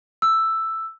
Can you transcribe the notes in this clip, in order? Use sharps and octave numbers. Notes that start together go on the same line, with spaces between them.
E6